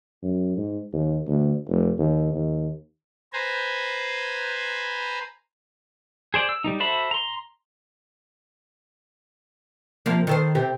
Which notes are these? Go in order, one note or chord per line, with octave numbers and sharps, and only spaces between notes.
F#2
G#2
D#2
D2
F1
D#2
D#2
B4 C5 G#5 A#5
G#4 C5 D5
E6
G3 A#3 D#4
F#4 A4 C5 E5 B5
A#5 C6
C3 F3 A#3
D#3 A4 C5
C3 C4 G4